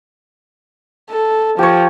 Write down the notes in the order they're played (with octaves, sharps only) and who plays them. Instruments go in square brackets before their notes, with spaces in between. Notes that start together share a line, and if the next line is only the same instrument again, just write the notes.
[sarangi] A4
[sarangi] F3 [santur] G4 C#5